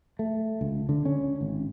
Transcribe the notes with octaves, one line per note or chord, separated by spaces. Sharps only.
A3
C#2
D3
C#4
G#1